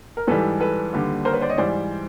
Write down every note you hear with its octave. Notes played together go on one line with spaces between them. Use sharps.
A#4
G#2 E3 G3 A4 B4
A4 B4
D#2 D3 G3
A#4 C5
B4 C#5
C5 D5
C#5 D#5
G#2 E3 G3 C5 D5